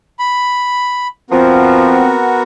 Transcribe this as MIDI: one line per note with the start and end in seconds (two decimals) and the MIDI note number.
0.19 1.07 83
1.31 2.06 53
1.31 2.43 59
1.31 2.18 60
1.31 2.43 66
1.31 2.43 70